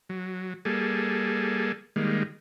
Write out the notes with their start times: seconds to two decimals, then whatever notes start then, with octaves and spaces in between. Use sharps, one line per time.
0.09 F#3
0.65 G3 A#3 G#4 A4
1.96 D#3 G3 G#3 A#3